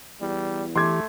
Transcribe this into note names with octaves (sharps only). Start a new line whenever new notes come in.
E2 G3
E3 A3 G4 C6 D6 G#6